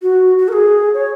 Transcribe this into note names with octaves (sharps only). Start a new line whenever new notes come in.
F#4
F#4
A#4
G#4
C#5